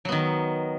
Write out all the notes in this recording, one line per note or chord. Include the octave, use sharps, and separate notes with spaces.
D#3 F#3 B3